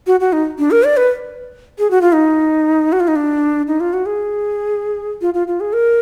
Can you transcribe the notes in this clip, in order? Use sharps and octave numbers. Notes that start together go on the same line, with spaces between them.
F#4
F#4
D#4
D4
A#4
D5
B4
G#4
F#4
F4
D#4
F#4
F4
D#4
D4
D#4
F4
F#4
G#4
F4
F4
F4
G#4
A#4